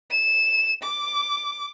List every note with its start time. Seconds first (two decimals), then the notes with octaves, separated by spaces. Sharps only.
0.11 E7
0.83 D6